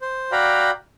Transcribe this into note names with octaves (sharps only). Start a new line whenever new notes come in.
C5
F#4 D5 F5 G5 A#5 B5